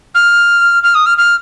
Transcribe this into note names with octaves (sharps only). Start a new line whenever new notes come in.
F6
F6
D#6
F6
F6